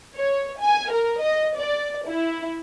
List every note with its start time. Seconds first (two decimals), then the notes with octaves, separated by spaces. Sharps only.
0.17 C#5
0.60 G#5
0.93 A#4
1.22 D#5
1.59 D5
2.07 E4